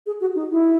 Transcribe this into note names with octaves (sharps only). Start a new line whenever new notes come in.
G#4
F#4
D#4
E4